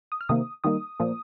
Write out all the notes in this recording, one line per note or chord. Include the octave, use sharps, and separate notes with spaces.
D#6
F6
C3 D#3 A#3 D#6
D#3 G3 A#3 D#6
A#2 F3 A#3